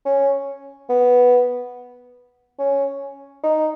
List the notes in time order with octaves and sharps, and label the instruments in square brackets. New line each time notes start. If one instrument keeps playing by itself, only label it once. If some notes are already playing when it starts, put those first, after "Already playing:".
[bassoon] C#4
B3
C#4
D#4